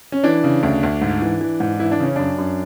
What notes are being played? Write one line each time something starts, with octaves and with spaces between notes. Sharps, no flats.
C#4
E3 D4
C#3
D2
D2
G#2
E3
E3
G#2
E3 E4
D4
C#3 C#4
F#2 D4
F#2